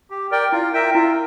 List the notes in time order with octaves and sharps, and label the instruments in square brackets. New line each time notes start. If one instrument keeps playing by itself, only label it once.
[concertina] G4
A#4 D5 G5
[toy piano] E4 [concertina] F4
[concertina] A#4 E5 G5
[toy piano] E4 [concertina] F4